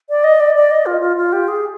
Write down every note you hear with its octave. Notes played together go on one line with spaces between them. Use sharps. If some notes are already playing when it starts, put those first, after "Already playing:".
D5
D#5
D5
D5
D#5
F4
F4
F4
G4
G#4